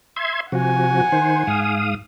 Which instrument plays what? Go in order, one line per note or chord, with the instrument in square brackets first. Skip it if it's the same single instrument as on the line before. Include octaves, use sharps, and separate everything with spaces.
[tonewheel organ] E5 C6 G#6
[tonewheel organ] C3 F3 F#4 [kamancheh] F#5 G#5
[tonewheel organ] D#3 C5
G#2 F5 D#6